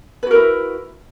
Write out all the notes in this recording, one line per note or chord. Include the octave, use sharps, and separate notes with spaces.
E4 F#4 A#4 B4